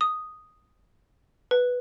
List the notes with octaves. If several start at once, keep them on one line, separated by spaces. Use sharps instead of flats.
D#6
B4